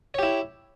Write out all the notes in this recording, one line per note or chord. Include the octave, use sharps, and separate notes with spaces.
E4 G4 C#5